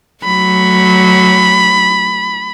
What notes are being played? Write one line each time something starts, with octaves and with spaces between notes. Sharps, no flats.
F#3 A3 B5